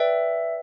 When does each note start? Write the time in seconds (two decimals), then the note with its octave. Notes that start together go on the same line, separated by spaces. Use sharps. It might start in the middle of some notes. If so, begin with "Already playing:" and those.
Already playing: B4 D5 E5 G5